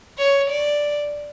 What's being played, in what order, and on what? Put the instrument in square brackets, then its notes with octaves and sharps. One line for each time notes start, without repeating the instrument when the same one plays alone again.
[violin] C#5
D5